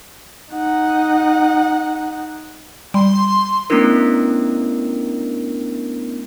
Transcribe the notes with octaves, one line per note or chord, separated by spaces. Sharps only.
D#4 F#5
G3 C6
A3 B3 C#4 D4 E4 A#4